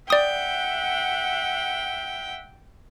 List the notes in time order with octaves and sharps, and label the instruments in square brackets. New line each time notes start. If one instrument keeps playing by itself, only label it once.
[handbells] D5 D#6 [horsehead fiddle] E5 F#5 [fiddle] G5